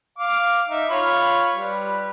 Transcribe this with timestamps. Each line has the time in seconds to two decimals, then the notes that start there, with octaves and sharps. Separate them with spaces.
0.18 F5 D6
0.69 D#4 E5
0.90 F4 C#5 B5
1.54 G3 B4